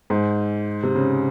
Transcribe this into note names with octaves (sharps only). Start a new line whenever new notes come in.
G#2
C3
C#3